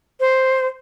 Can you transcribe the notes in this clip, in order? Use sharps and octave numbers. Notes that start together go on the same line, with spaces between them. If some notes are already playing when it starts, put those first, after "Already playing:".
C5